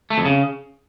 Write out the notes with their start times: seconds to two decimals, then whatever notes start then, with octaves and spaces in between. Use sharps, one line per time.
0.10 A3
0.18 F2
0.25 C#3